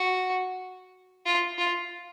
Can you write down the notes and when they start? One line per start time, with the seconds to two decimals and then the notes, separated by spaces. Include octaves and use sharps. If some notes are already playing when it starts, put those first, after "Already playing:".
Already playing: F#4
1.26 F4
1.58 F4